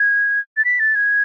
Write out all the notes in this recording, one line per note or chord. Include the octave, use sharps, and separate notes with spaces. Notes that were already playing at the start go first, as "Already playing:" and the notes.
Already playing: G#6
A6
B6
A6
G#6